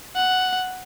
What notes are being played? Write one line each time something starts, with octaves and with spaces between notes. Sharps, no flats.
F#5